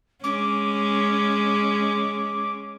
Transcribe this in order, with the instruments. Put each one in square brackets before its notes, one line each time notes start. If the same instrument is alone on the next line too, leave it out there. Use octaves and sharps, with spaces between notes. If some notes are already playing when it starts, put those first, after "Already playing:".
[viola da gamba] G#3 C#4 [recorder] D6